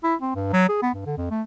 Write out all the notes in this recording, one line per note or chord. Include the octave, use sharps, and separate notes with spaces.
E4
C4
G2
F#3
G#4
B3
G2
D3
F2
A3